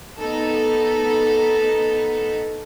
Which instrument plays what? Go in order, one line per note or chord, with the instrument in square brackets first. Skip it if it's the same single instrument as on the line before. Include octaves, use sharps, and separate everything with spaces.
[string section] B3 D#4 A4